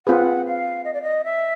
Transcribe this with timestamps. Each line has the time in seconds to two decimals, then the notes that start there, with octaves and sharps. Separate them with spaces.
0.06 C4 F4 G#4 B4 F#5
0.46 F5
0.85 D#5
0.94 D5
1.02 D#5
1.24 E5